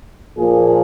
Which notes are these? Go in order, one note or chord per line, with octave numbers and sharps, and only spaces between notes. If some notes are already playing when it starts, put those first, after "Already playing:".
A#2 F3 A#3 F4 G#4